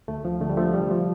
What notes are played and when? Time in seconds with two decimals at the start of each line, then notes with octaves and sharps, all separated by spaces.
0.08 D2 A3
0.25 F3
0.40 D3 A3
0.50 G3
0.57 F3 A3
0.74 C2 G3
0.91 F3